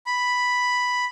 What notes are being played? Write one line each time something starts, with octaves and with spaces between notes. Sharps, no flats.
B5